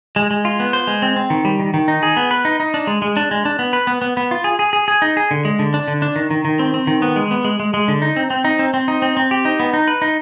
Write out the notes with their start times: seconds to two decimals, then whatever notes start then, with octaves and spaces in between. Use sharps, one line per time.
0.16 G#3
0.31 G#3
0.45 F4
0.60 B3
0.73 C5
0.87 G#3
1.02 C4
1.16 C4
1.30 D#3
1.45 G3
1.59 D#3
1.74 D#3
1.88 D#4
2.03 G#4
2.17 B3
2.31 B4
2.45 D#4
2.60 D#4
2.74 D4
2.87 G#3
3.02 G#3
3.17 D4
3.31 G#3
3.45 D4
3.59 B3
3.73 B4
3.87 B3
4.02 B3
4.17 B3
4.31 F4
4.44 G#4
4.59 G#4
4.73 G#4
4.88 G#4
5.02 D#4
5.17 G#4
5.31 D3
5.45 G#3
5.59 D3
5.74 D4
5.88 D3
6.02 D4
6.16 D#3
6.31 D#3
6.45 D#3
6.59 C4
6.74 C4
6.87 D#3
7.02 B3
7.16 G#3
7.31 B3
7.45 G#3
7.60 G#3
7.74 G#3
7.88 D3
8.02 D#4
8.16 C4
8.30 C4
8.44 D#4
8.59 C4
8.74 C4
8.88 D#4
9.02 C4
9.17 C4
9.31 G4
9.45 D#4
9.60 B3
9.74 D#4
9.88 B4
10.02 D#4